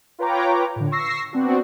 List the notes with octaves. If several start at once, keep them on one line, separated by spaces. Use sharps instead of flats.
F4 B4 C#5 G5 A#5 D6
A2 D3
C#6 E6 A#6 C7
B3 C4 D4 F#4